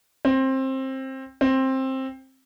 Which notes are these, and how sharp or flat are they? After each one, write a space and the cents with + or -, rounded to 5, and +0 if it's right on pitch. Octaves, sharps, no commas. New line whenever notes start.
C4 +20
C4 +15